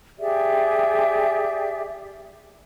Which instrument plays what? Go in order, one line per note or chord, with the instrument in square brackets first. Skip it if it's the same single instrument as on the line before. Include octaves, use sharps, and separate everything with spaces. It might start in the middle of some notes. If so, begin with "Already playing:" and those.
[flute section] G4 G#4 D5 E5